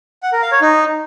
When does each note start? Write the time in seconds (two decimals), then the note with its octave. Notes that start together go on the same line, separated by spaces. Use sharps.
0.23 F#5
0.33 A#4
0.42 F5
0.52 C#5
0.61 D#4